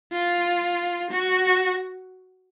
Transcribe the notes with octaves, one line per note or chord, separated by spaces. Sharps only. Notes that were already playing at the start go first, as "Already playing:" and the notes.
F4
F#4